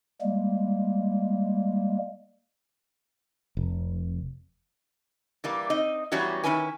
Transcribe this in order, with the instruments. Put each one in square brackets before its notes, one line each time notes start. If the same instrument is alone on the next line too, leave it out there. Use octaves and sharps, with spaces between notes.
[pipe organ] G3 G#3 A#3
[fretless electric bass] F1
[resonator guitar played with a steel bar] E3 G3 A#3
C4 D#4 D#5
E3 F#3 G3 B3 C#4 F#4
D#3 G#3 C#4 E4 B4 G#5